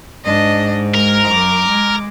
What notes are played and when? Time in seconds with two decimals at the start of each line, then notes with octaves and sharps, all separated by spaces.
0.24 G#2 D4 D#5
0.94 G#3 A#4
1.27 F#2 D6
1.69 G#3